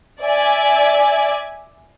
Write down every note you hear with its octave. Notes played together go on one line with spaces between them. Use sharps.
D5 E5 G#5